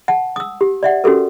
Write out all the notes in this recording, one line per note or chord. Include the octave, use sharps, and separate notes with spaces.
F#5 A5
D#6 E6
G4
D5 E5 F#5
C#4 F#4 G4 A4 A#4